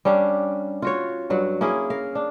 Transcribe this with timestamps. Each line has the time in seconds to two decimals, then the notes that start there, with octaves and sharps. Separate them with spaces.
0.05 G3 C#4 D4 F5
0.82 F4 F#4 C#5
1.30 G2 F#3 F#5
1.61 A#3 C#4 E4 G#4
1.90 A#4 F5
2.15 D4